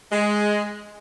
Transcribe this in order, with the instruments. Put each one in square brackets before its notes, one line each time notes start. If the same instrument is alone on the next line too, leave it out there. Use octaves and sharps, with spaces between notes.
[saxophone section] G#3